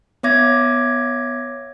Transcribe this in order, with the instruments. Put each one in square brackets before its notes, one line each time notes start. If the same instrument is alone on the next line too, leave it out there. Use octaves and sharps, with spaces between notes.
[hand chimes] B3 C#5 E5 D6 G#6 A#6